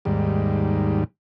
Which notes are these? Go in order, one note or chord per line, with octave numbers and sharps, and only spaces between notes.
D#2 G#2 G3